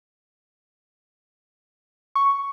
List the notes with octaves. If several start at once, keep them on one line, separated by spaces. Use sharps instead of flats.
C#6